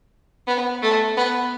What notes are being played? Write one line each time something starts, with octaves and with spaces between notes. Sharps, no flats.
B3
A3
B3